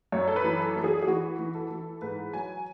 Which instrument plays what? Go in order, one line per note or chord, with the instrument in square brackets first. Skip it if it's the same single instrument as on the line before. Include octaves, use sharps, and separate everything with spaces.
[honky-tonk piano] F#2 C#5
A4
B4
E3
A4
E3
G#4
G#4
E3 F#4
E3
A4
E3
G#2 B4
F#3 G#5